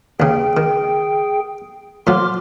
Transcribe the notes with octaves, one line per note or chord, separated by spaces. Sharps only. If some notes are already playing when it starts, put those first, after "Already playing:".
D#2 C#3 G#4 G5
D#3
A2 F3 F#3 C6 D6 F6